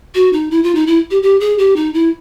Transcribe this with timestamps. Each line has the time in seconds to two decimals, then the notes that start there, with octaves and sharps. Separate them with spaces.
0.15 F#4
0.33 D#4
0.51 E4
0.63 F4
0.75 D#4
0.87 E4
1.11 G4
1.23 G4
1.40 G#4
1.58 G4
1.76 D#4
1.94 E4